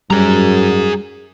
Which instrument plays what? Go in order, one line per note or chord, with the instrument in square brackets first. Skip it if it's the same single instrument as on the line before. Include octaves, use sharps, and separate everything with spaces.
[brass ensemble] F#2 [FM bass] G3 [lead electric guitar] G#4 A#5